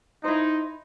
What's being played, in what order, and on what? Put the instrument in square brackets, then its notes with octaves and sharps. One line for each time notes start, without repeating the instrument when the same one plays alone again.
[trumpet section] D#4 [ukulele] E4 C5